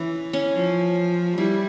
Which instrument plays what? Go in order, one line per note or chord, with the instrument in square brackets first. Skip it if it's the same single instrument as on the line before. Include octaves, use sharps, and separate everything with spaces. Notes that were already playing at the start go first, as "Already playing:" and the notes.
Already playing: [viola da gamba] E3 [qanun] C#4
[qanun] C#4
[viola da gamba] F3
[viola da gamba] G3 [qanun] E4